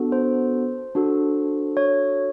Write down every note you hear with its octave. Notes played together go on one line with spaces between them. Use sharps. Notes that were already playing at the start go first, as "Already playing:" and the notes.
Already playing: B3 D4 F#4 A4
C5
D4 F#4 A4
C#5